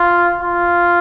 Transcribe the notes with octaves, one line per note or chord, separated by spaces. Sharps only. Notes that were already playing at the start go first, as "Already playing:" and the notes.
Already playing: F4
F4